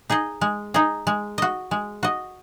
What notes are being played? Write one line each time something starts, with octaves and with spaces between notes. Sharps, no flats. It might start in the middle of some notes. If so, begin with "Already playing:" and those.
D#4 G#4 D#5
G#3
D#4 G#4 D#5
G#3
F#4 D#5
G#3
F#4 D#5